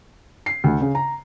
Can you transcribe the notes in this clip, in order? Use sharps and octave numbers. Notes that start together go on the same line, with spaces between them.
C7
D2
C#3
A#5